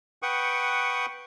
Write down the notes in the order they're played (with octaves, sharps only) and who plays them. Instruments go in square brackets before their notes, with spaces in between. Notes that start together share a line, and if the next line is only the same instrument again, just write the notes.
[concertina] B4 F#5 G5 C#6 D#6